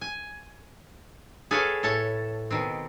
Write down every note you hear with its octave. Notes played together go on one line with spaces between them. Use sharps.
G#5
G#4 A4 B4 C#5 F5 G5
A2 A4 C#5 A5
B2 D#3 C4